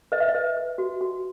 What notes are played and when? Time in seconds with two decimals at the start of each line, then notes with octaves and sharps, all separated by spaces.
0.12 B4 D#5
0.20 E5
0.29 D#5
0.35 B4
0.57 B4
0.78 F#4
1.01 F#4